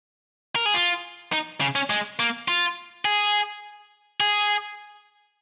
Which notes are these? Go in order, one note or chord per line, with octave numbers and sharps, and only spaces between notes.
A#4
G#4
F4
D#4
C#3
C#4
G#3
A#3
F4
G#4
G#4